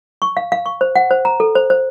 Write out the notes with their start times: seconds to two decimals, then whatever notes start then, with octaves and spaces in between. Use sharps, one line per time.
0.22 C#6
0.37 F5
0.52 F5
0.66 C#6
0.81 C5
0.96 F#5
1.11 C5
1.25 A#5
1.40 A4
1.55 C5
1.70 C5